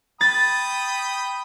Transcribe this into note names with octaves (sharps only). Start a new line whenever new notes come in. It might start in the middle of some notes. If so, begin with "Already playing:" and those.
G5 B5 D#6 A6